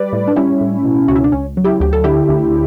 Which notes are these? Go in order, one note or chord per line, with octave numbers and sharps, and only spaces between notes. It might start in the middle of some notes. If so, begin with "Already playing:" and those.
Already playing: G3 B4 D5
A2
D4
G3 C#4 E4
A2
B2
C#2 F#4
E4
D4
C#2 C#4
F#3
E4 G4
D2 G4
A4
D3 E4 G4
D2